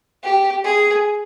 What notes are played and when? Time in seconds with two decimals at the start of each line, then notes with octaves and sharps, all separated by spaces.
0.23 G4
0.65 G#4